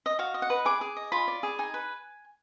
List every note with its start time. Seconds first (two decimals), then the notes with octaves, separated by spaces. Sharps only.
0.06 D#5
0.19 F#4 F5
0.34 D#5
0.42 F#5
0.50 B4
0.65 G#4 D6
0.81 G#4
0.96 D#5
1.12 F4 B5
1.28 D5
1.43 G#4
1.59 D#4 G#5
1.74 B4